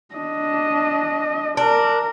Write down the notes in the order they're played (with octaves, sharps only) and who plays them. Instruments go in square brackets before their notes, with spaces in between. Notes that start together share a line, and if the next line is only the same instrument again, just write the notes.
[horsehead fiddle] D4 D#5
[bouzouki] D4 [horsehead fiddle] A#4